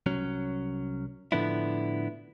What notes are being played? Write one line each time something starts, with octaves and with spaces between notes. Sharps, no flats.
C2 F#3 C#4
A2 D3 F3 B3 D4 E4